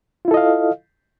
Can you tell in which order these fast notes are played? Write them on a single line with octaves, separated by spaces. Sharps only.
F4 E4 A4 D#5 F5